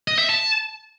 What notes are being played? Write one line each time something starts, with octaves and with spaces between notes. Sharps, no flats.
D#5
E5
A5